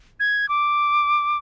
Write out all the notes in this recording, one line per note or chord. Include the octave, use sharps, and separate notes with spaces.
G#6
D6